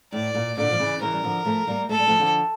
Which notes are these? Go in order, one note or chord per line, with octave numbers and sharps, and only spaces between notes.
A2 D5
A#2
A#2 D3 D5
F3
C#3 E3
C#3 E3 A#4
G3
D3 F3
F3 A3
G3 A#3
A3 A4
G3
F3 A3
D3 F3